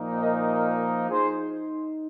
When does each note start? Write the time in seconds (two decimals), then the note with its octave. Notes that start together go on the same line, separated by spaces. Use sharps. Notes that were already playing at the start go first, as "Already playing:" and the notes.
Already playing: A#2 F3 A#3 D#4
0.19 A#4 D#5
0.49 A#4 D#5
1.10 D#4 G#4 C5